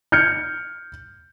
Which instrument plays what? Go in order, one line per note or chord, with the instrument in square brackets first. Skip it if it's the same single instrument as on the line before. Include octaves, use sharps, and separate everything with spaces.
[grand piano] F6 G6 G#6 C#7